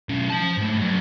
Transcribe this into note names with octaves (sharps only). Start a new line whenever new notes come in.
B1 C#4
F3 A5
G#2 A3
F#3 A#3